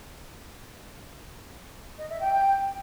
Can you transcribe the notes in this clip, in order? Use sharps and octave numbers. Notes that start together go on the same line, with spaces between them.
D#5
E5
G5